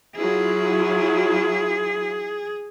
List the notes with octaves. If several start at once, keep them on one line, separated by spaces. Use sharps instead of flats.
F#3 E4 F4 G#4